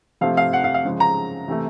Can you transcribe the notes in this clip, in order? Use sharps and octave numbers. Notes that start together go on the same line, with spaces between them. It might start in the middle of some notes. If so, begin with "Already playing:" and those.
C3 F3 A3 F5
F5
F#5
F5
F5
C#3 F3 G#3
A#5
C3 E3 A3